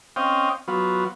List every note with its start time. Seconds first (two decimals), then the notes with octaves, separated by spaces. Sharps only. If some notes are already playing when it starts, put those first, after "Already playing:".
0.16 C4 C#4 D#5 F5 G5
0.68 F#3 B3 F4